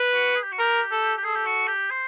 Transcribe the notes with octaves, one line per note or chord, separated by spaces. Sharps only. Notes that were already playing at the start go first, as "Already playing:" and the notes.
Already playing: B4
F#4
G#4
G4
F#4
G4 A#4
A4
G4
G#4 A4
G4
F#4
G4
C5